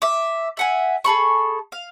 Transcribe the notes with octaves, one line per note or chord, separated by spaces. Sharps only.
E5 D6
E5 F#5 G#5
G#4 A4 B5 C#6
F5